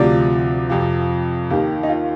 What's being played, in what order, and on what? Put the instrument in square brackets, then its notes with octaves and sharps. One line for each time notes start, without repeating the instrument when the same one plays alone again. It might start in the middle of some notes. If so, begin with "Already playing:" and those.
Already playing: [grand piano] D2 C3 F3 D5
F2 C3 F3
D#2 D#3 G4
D#4
F4